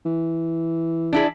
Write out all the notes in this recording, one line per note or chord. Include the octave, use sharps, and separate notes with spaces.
E3
D4 E4 G#4